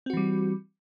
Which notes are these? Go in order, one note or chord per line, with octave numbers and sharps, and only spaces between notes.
E3 G3 C4 F#4